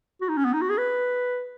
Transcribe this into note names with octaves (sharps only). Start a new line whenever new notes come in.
F#4
D#4
C#4
B3
D#4
F#4
G#4
B4